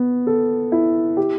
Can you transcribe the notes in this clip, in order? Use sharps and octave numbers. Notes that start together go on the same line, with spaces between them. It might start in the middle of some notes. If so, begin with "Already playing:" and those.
Already playing: B3
A4
E4
G4